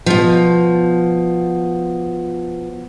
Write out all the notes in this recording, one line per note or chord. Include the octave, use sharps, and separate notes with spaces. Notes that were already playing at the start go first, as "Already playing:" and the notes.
B2 F3